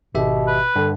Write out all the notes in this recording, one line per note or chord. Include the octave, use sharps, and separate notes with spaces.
G#1 B2 G4 E5
B4
G2 D3